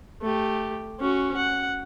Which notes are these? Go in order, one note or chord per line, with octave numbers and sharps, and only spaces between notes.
A3 G4
C#4 F#4
F#5